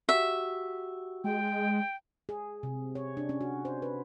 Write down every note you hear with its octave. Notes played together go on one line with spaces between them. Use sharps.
F#4 G4 E5
G#3 G5
G#4
C3
C#5
D4
C#4
F#4
C5
B4